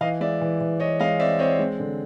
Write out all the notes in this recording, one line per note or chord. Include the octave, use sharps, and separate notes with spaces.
E3 D#5 F5
G#3 D5 E5
E3
E3
E3 C#5 D#5
G#3 D#5 F5
C4 D5 E5
C4 C#5 D#5
G#3
D3